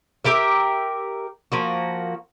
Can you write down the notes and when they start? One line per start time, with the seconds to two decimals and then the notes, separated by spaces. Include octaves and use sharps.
0.25 G4 A#4 E5
1.52 F3 A#3 F#4